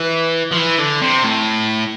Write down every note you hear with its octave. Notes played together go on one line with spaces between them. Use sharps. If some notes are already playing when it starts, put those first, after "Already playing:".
Already playing: E3
F3
E3
D3
C3
A2